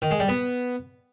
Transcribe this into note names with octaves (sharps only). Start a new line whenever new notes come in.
D#3
G#3
G3
B3